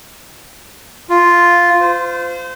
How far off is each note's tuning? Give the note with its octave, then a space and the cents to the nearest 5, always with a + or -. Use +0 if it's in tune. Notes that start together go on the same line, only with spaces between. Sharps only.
F4 +0
C5 -30